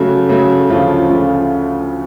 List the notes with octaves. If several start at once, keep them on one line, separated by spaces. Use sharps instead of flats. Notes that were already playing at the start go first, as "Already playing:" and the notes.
Already playing: C#3 F#3 A3
C#3 F#3 A3
D2 C#3 F3 A3 F4
C#3 F3 A3 F4